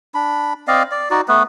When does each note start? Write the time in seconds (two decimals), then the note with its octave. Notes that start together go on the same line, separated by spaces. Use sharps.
0.14 D4 B5
0.68 C4 D5 D#5 F5
0.91 D5
1.11 D#4 F#4 D5
1.28 A3 B3 B4